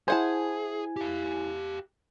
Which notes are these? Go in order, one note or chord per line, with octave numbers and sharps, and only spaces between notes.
E4 G#4 C5 F#5 G#5 A5
G4 F5